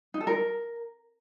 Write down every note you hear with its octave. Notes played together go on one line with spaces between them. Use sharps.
D#4
A4
A#4